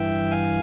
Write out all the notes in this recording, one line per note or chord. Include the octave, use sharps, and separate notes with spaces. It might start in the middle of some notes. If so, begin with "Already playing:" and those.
Already playing: G2 E3 E5 G5
F5 G#5